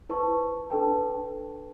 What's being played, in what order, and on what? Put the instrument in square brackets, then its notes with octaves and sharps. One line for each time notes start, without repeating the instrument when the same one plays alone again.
[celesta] E4 B4 C5 A5 C#6
D4 A4 B4 G5 A5